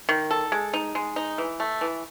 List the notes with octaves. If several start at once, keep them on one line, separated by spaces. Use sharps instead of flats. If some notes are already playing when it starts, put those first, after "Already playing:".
D#3
A4
G#3
D#4
G#3
D#4
E3
A3
E3